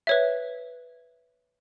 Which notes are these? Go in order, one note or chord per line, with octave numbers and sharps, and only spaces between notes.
B4 C#5 E5